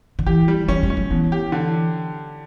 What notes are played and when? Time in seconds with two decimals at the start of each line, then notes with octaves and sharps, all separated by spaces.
0.19 D3
0.27 E3 G4
0.48 G3
0.68 F#3 C#4
0.83 G3
0.90 C#4
0.97 F#3
1.10 B2 E3
1.32 G4
1.52 D3